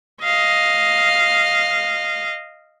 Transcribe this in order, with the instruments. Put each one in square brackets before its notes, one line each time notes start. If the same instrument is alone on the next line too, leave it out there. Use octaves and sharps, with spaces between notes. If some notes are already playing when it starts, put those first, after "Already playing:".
[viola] D#5 F5